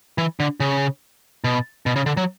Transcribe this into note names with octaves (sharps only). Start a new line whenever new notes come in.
E3
D3
C#3
B2
B2
C#3
D3
F#3